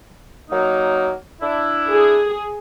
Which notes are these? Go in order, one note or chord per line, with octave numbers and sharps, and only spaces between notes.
F#3 A#3 D#4
D4 E4
G#4